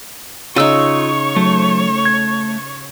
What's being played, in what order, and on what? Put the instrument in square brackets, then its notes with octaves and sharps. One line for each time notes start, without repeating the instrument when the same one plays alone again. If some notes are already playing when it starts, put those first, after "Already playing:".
[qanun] C#3 D#4 [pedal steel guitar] F4 E6 [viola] C#5 C#6
[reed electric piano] F#3 [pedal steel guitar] A3
[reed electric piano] G#6